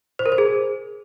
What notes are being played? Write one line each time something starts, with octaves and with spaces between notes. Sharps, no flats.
C5
A#4
C5
G#4